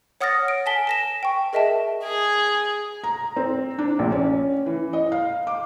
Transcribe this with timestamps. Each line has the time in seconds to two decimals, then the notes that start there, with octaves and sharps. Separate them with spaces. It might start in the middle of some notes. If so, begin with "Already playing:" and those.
0.21 C#5 F#5 D#6 F6 A6 A#6
0.48 D7
0.66 G#5 A5 B6 G7
0.87 A5 A#6 E7
1.23 G5 C#6
1.53 G#4 A#4 D#5 E5 G5 A5
2.04 G#4
3.04 A#5
3.36 C4
3.79 D4
3.99 A#1
4.12 C#4
4.66 E3
4.93 D#5
5.12 F5
5.47 D6